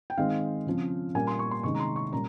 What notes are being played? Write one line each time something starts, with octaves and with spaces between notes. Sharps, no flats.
G5
D#3 G#3 C4 F5
C#3 F3 C4
A#2 G3 A#3 C#4 G#5
C6
C#6
C6
C3 D#3 G#3 C#4 C#6
A#5
C6
C#6
A#2 G3 C#4 A#5